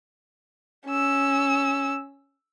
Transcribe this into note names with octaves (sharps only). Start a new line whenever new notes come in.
C#4 E6